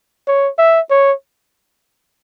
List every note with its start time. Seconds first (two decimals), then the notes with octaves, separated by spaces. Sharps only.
0.27 C#5
0.59 E5
0.91 C#5